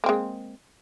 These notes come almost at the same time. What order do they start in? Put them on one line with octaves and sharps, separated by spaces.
A#3 C4 G#3